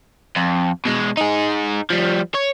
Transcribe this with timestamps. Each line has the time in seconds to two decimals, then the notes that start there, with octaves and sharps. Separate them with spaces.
0.36 F2
0.85 B2 G#3
1.17 D#4 G#4
1.90 F3 G3
2.34 C#5